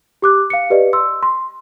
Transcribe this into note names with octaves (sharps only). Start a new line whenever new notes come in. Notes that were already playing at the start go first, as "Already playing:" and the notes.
G4 D6 F#6
F5 C#7
G4 B4 D5 D#5
C6 E6
C6